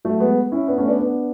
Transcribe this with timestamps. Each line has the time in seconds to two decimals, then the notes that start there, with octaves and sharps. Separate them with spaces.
0.05 F#3 A3
0.20 G#3 B3
0.52 C#4 E4
0.67 B3 D4
0.78 A3 C#4
0.88 B3 D4
0.99 B3 D4